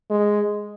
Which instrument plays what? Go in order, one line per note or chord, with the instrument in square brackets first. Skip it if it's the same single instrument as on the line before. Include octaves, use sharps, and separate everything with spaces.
[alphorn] G#3